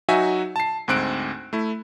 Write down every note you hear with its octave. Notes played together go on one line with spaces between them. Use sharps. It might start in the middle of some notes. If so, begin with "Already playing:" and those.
F#3 D#4 F#4 E5 G#5
A5 C7
D2 G#2 C4 F#6 D7
A3 E4